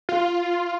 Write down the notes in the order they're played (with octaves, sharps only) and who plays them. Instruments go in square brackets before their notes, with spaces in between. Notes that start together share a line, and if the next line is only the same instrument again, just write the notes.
[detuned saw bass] F4